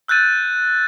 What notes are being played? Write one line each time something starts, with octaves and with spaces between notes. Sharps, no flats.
E6 F#6 G6 A6 D#7